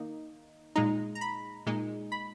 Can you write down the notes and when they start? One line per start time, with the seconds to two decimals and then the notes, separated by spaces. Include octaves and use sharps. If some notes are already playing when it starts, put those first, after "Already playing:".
Already playing: D#3 A#3 D#4
0.76 A#2 G#3 D#4 A#5
1.15 A#5
1.21 B5
1.66 A#2 G#3 D#4
2.12 B5